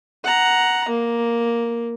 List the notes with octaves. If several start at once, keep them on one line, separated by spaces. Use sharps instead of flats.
F#5 A#5
A#3